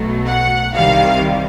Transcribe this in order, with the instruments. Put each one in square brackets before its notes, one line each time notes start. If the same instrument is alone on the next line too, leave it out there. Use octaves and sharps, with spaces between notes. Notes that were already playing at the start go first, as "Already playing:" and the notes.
Already playing: [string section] B1 B2 F#3 A3
F#5
C2 C3 D#3 G3 F5